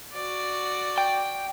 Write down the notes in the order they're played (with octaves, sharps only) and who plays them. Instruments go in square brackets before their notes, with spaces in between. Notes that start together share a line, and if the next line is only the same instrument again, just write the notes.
[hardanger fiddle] F#4 D5
[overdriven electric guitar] G5